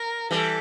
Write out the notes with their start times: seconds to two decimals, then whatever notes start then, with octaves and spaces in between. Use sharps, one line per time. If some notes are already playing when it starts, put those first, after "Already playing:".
Already playing: A#4
0.30 E3 G3 A4